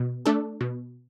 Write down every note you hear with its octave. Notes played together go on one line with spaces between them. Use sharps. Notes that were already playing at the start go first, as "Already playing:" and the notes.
Already playing: B2
A3 D4 A4
B2